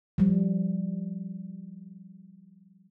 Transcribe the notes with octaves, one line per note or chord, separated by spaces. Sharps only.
F3 G3